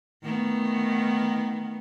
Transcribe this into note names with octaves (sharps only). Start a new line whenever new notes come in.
D#3 A3 B3